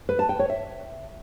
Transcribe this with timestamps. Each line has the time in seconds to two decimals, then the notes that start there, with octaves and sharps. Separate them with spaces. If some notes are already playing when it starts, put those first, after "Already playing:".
0.09 B4
0.19 A5
0.29 G5
0.39 C#5
0.50 E5